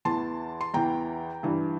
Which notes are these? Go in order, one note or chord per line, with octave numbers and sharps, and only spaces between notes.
E2 E3 A5 C6
C6
E2 E3 G5 A#5
G2 E3